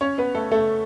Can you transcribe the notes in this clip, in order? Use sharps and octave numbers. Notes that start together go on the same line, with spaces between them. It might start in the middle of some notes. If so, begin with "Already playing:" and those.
C#4 C#5
B3 B4
A3 A4
A3 A4